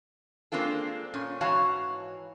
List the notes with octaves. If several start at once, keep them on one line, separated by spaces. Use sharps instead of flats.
G#3 A#3 C4 D4 F4 A4
A#2 C#4
G#2 E3 F#4 C#5 F5 A5